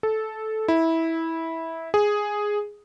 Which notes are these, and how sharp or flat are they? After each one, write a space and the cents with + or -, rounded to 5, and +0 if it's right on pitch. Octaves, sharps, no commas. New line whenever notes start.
A4 -10
E4 -15
G#4 +0